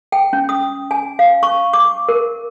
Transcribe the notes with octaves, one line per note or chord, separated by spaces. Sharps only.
G5
C#4
D#6
G#5
F5
C#6
D6
A#4